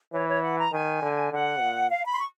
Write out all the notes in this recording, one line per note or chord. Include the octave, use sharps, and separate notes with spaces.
E3 C#5
C#5
F#5
A#5
D#3 G#5
D3
D3 F#5
A#2
F5
B5
C6
C#6